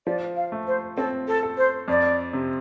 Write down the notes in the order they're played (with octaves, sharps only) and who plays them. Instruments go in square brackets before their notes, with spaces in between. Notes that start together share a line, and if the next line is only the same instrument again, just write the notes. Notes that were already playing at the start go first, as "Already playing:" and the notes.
[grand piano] F3 [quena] D5
[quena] F5
[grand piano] A3
[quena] C5
[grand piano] C4 [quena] A4
[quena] A4
[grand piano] A4
[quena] C5
[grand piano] F2 [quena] D5
[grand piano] C3